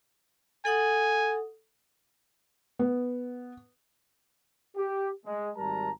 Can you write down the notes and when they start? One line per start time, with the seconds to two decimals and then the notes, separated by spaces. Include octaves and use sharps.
0.65 A4 F#5 G#5 D#6
2.79 B3
4.76 G4
5.25 G#3
5.57 G#1 G3 A#4 A5 A#5